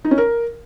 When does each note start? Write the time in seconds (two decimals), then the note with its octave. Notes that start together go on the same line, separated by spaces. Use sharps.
0.05 D#4
0.11 C#4
0.18 A#4